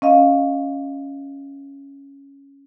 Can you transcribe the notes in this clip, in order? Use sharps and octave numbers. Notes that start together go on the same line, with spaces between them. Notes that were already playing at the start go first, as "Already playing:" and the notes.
C#4 D#5 F5